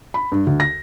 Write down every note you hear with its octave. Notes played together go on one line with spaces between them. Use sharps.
B5
G2
D2
A#6